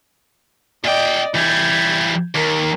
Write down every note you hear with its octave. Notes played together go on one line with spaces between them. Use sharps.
A#2 D5 D#5 G5
E3 G3 G6 G#6
D#2 A#4